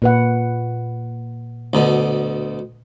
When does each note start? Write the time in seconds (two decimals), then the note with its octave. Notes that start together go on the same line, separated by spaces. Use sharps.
0.02 A#2 B4 F#5
1.73 D2 B2 D3